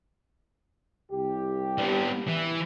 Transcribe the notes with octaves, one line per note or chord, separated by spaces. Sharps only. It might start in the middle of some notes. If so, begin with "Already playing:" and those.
C2 G4
B3 D4
E3